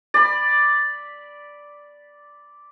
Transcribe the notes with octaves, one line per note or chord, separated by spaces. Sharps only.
D5 B5